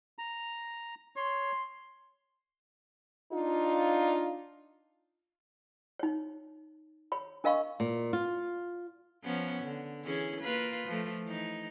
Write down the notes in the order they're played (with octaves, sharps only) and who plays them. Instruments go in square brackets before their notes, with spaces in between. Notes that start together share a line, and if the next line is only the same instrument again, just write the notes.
[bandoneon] A#5
[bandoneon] C#5 [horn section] C6
[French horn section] D4 D#4 F4
[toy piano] D#4 C#5
C#5 B5
D4 A#4 D#5 F5 B5 C#6
[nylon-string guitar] A#2
F4
[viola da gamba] F3 B3 C#4
D3
E3 C#4 G#4
A#3 F4 B4
F3 A3
E3 D#4